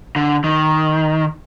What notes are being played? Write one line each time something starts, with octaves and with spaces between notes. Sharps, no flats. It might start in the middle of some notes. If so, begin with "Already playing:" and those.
D3
D#3